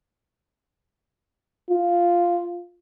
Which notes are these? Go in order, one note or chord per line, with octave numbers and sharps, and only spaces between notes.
F4